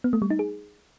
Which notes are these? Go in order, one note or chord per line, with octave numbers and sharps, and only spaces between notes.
B3
A3
G3
D#4
G#4